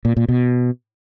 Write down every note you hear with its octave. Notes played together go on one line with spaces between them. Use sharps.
A#2
A#2
B2